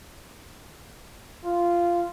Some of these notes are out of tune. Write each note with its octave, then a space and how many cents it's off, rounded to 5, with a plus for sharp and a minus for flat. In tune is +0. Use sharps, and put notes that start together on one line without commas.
F4 -10